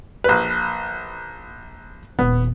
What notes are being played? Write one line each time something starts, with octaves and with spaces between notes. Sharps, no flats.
A#1 B4
D#1 B3